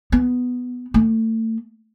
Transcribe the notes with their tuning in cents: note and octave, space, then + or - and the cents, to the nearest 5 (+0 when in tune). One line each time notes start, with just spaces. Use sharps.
B3 +5
A3 +30